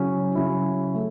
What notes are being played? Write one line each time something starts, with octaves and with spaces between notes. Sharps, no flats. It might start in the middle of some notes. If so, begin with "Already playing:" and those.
Already playing: C#3 F#3 C#4 E4
C#3 F#3 C#4 E4
A3